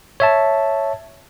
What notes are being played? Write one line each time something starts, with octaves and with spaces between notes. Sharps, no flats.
C#5 E5 A5